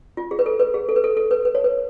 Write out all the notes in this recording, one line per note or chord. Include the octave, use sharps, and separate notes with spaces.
F4
G#4
B4
A4
B4
G#4
A4
B4
A4
A4
B4
B4
C#5
B4